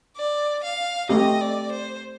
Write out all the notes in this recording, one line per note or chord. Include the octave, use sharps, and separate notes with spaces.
D5
F5
A3 C4 G4 D#5
D5
C5